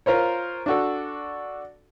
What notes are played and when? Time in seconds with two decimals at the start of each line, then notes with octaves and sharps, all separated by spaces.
0.06 F4 A#4 C5 C#5
0.66 D4 F#4 A4